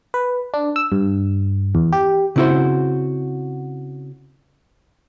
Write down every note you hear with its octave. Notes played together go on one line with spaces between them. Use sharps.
B4
D4
E6
G2
E2
G4
C#3 C4 E4 F#4 C5